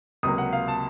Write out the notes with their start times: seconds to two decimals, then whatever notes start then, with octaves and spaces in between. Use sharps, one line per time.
0.23 C#2 C3 F#3 A#3 D#6
0.38 F#5
0.53 F5
0.68 A5